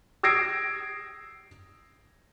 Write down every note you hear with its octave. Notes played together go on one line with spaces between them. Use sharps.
D#6 E6 G#6 A#6 C7 D7